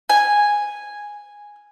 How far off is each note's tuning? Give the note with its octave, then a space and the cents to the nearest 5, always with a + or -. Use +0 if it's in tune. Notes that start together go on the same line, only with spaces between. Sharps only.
G#5 -5